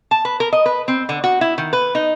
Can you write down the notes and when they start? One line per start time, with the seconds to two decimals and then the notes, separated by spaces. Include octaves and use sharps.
0.11 A5
0.25 B4
0.40 A#4
0.53 D#5
0.66 B4
0.88 C4
1.09 D3
1.24 F#4
1.41 E4
1.58 D#3
1.73 B4
1.95 D#4